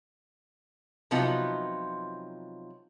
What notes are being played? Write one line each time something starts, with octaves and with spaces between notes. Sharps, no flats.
C3 F3 F#3 B3 D#4 F4